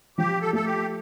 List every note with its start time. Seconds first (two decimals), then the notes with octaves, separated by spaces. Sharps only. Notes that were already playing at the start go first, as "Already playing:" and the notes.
0.18 F3 G4
0.41 A4
0.53 A3 A4
0.65 G4